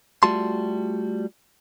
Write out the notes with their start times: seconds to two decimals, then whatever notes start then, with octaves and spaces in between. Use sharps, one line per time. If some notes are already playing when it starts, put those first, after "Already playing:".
0.23 G3 A3 F4 F#4 A5 C6